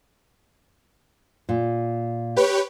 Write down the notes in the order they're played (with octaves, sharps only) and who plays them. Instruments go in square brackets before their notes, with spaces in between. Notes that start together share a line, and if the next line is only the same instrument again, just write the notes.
[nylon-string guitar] A#2
[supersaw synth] G4 B4 C#5